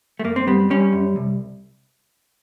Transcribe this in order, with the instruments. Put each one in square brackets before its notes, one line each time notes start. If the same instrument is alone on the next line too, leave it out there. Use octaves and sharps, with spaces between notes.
[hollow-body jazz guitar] A3
F#2 A#3
C4
G3 B3
G3 C#4
F#2
C2